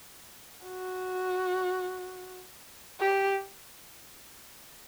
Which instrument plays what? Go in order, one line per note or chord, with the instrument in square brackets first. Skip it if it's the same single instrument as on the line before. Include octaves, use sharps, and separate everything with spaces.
[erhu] F#4
G4